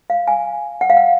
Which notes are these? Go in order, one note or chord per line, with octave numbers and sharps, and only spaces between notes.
F5
G#5
F#5
F5
F#5